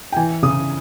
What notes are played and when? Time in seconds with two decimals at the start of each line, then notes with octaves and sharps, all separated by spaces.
0.12 G5
0.16 E3 G#5
0.43 C#3 D#6